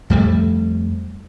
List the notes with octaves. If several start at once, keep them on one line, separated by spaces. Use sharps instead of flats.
F2 G3 A3